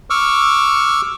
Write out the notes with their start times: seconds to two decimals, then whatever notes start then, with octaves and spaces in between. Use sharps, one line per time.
0.10 C#6 D6 E6 F6